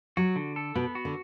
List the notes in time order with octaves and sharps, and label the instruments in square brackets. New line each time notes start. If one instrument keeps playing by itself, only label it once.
[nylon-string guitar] F#3 [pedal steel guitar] F#4
[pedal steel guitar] D3
A4
[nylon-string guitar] B2 [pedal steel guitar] B3
[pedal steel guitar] F#4
[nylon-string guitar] D3